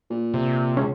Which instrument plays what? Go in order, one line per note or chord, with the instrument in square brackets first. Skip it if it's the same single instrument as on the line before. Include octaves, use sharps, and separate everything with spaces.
[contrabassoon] A#2
[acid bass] C3
[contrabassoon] C#2 [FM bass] C#4